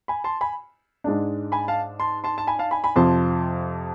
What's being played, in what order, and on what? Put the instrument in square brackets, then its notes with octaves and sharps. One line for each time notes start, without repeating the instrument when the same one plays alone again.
[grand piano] G#5 B5
A5 C6
G#5 B5
[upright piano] G#2 G#3 D4
[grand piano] G#5 B5
F5 A5
A5 C6
A5 C6
A5
G#5 B5
F5 A5
G#5 B5
G#5 B5
[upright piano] F2 C3 F3 [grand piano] A5 C6